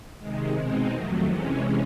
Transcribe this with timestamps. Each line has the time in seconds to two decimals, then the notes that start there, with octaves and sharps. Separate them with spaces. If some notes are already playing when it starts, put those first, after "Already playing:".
0.19 C3 D#3 G#3
0.55 B2 G#3 C4 D#4
0.90 F2 C3 D#3 F#3 A3
1.26 C3 E3 G#3 C#4